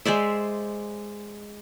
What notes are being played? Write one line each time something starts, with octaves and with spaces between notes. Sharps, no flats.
G#3 C5 D5 E5